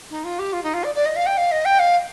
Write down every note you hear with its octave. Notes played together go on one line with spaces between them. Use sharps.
D#4
F4
G4
F4
D#4
F4
D5
D5
D#5
F5
G5
F5
D#5
G5
F5